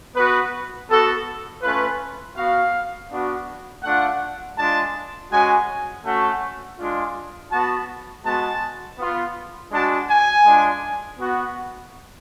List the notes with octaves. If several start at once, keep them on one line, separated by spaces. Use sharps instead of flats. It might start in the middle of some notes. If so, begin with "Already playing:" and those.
B3 F#4 B4
B3 F#4 A4
A3 C#4 F4 B4
B3 F#4 F5
B3 D4 F#4
A3 D4 F4 F#5
G#3 D4 F4 A5
G#3 C#4 F#4 G#5
A3 C#4 F#4
G#3 D4 F4
B3 F#4 A5
G#3 B3 F#4 A5
B3 F4
G#3 D4 F#4 A5
G#5
G#3 D4 F4
B3 F#4